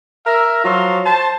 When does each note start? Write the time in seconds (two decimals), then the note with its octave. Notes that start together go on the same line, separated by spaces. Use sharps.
0.26 A#4 E5
0.65 F3 F#3 F4 C6
1.06 C5 A5